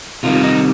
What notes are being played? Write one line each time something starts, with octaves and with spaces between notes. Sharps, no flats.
C3 D#3 G3 F4
D#4